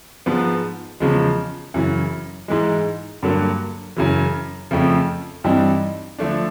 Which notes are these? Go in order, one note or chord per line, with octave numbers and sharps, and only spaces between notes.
G#2 F3 G#3 B3
E2 C#3 F3 G#3
F#2 C#3 E3
G#2 E3 G#3
G2 D3 F#3 A#3
F#2 C#3 E3
F2 C#3 F3 A3
G2 E3 G3 C4 D#4
D3 F3 A3 D4